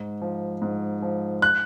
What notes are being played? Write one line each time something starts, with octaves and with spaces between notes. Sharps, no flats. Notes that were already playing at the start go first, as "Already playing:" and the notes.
Already playing: G#2
F3
G#2
F3
F#6